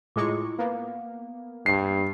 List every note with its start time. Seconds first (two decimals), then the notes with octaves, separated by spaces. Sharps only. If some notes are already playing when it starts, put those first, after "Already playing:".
0.16 A2 G#3 E4 F4 C#6 D6
0.59 A#3 B3 F5
1.66 G2 C7